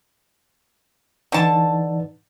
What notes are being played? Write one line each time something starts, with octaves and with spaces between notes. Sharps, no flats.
D3 E3 D#4 B4 A5